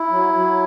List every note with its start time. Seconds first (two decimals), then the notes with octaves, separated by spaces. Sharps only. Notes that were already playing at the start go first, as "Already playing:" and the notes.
Already playing: E4
0.10 F#3
0.33 F#3